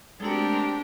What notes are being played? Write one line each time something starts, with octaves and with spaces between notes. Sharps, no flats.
G#3 A3 C4 D4 F#4 G4 A#4